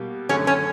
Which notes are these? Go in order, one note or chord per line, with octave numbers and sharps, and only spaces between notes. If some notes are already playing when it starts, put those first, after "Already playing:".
Already playing: B2 G3 A#3 G4
F#2 D3 F#3 A3 C#4
C#4